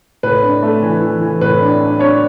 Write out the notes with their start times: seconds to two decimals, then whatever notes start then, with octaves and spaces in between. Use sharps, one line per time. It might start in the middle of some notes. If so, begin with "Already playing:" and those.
0.23 A2 B4
0.43 D4
0.63 A3
0.83 E3
1.02 E3
1.22 E3
1.41 A2 B4
1.61 D4
1.81 D4
1.99 D4 C#5